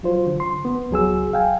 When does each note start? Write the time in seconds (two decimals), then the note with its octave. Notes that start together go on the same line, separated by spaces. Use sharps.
0.03 F#3 F4 C5
0.26 D3
0.40 C6
0.65 B3
0.91 C#2 F#3 G#4 E6
1.33 F5 G5 G#5